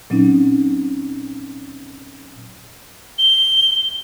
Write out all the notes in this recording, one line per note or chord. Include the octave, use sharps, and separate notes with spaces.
A#2 F#3 C4 C#4 D#4
G7